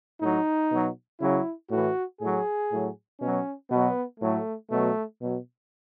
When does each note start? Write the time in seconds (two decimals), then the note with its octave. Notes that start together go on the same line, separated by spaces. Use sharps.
0.21 A2 F#3 D#4
0.70 B2 F#3
1.21 C#3 F#3 E4
1.71 A2 E3 F#4
2.20 A2 F#3 G#4
2.71 A2 F#3
3.20 B2 F#3 C#4
3.70 B2 F#3 B3
4.20 A2 F#3 A3
4.71 B2 F#3 A3
5.20 B2 F#3